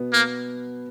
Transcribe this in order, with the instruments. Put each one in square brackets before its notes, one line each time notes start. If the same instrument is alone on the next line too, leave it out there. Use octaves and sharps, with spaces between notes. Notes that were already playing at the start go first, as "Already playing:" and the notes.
Already playing: [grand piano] B2 B3
[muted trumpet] A#3